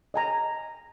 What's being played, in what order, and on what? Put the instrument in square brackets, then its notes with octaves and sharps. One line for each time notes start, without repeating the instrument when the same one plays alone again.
[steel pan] D#5 G#5 A#5